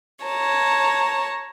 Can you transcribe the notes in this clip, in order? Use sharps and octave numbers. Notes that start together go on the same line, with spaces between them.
C#5 A5 A#5